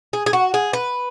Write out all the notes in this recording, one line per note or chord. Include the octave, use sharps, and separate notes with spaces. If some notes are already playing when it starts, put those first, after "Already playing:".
G#4
G#4
F#4
G#4
B4